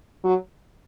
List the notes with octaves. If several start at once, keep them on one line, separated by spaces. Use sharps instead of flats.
F#3